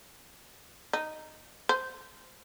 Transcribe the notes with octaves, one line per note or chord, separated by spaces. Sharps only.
D#4
C5